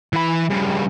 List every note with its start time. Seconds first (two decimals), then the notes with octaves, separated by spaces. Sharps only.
0.13 E3 B5
0.50 G2 C#3